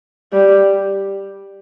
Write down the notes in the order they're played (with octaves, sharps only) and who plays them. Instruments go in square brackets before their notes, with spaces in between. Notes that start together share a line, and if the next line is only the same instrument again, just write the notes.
[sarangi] G3